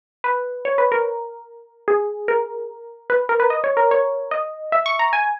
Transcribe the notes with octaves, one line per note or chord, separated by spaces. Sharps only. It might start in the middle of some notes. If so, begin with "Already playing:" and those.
B4
C#5
B4
A#4
G#4
A#4
B4
A#4
B4
D#5
C#5
A#4
C#5
D#5
E5
C#6
A#5
G#5